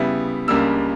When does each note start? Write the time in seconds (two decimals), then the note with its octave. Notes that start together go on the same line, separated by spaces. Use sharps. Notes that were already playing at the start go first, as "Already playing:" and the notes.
Already playing: C#3 G3 B3 E4
0.47 C#2 C#3 G3 A#3 D4 E6